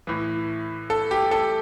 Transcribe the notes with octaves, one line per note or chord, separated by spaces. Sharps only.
A2 E3
A4
G4
A4